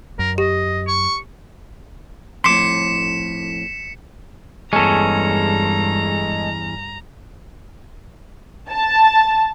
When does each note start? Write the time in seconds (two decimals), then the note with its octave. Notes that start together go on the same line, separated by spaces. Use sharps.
0.19 F#2 A#4
0.38 G4 D#5
0.87 C#6
2.44 F2 A2 C6 D6 B6 C#7 E7
4.73 E2 G2 G#3 C#4 A4 A#5
8.69 A5